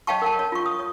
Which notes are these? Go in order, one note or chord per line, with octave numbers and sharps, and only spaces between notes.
C#5 D#5 F5 G5 A5 C#6
A#4 F5 A5
C#5
F4 C#6
D#6
C#5